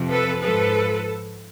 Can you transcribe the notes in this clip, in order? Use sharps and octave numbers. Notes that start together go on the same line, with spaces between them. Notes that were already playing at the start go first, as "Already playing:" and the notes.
Already playing: F2 C3 F3
A4 B4
G#2 F3 A4 B4